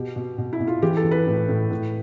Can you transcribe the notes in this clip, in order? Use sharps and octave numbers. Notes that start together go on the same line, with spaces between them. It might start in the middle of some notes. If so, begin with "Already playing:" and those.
Already playing: B2 G4
B2
B2
E4
B2
F4
E3 G4
A4
E3
B4
A2
A2
A2